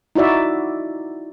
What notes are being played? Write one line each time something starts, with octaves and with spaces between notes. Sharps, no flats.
D#4 E4 F#4 D5 E5